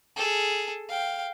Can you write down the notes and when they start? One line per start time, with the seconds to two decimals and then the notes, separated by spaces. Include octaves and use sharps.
0.16 G#4 A4
0.89 F5 G5